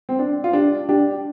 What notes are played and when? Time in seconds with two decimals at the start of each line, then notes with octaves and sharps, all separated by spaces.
0.09 C4
0.19 D4
0.44 F4
0.53 D4 G4
0.89 D4 G4